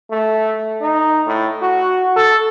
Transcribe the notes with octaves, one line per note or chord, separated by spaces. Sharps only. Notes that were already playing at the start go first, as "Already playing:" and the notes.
A3
D#4
A2
F#4
A4